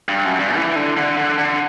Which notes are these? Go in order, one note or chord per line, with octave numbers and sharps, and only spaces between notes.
G2
F#2
G2
E3
D3
D3
D3
D3